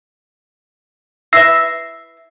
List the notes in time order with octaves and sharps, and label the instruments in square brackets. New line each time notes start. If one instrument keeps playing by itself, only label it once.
[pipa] E4 B4 E5 [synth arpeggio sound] E6 A#6 C7